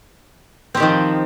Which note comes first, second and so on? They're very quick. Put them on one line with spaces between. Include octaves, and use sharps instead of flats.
C4 G4 D#3 F3